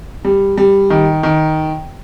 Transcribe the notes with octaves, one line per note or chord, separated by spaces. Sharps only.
G3
G3
D#3
D#3